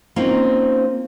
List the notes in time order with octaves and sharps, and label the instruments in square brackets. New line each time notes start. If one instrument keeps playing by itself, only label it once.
[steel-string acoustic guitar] A#3 C4 C#4 D#4 F4